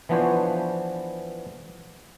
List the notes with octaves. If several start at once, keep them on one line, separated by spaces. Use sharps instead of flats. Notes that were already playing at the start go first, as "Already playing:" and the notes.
E3 F3 B3 D4 C5 C#5